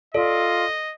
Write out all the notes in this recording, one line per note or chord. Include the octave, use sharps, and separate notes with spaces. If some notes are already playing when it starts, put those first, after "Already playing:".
F4 A4 D5 D#5